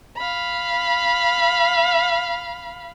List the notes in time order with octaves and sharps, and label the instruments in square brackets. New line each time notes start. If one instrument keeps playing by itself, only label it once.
[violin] F5 B5